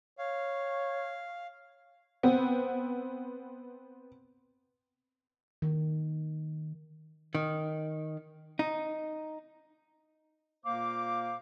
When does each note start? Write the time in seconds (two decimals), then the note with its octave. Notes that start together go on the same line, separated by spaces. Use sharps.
0.19 C#5 F5
2.23 B3 C4
5.62 D#3
7.35 D#3
8.59 D#4
10.64 A#2 A#3 C5 F5 D6